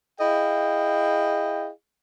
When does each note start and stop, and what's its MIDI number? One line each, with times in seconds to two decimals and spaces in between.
0.19 1.69 64
0.19 1.69 68
0.19 1.69 75
0.19 1.69 77
0.19 1.69 79